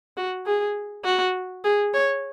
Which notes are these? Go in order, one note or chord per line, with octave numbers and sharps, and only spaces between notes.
F#4
G#4
F#4
G#4
C#5